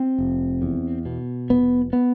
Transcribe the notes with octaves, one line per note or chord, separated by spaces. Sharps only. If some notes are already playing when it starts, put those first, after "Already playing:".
Already playing: C4
F1
E2
B2
F1 B3
B3